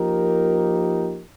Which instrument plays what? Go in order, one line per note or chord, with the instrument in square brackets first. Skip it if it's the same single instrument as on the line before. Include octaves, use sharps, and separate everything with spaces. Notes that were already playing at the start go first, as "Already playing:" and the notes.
Already playing: [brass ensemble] F3 A#3 D#4 G4 A#4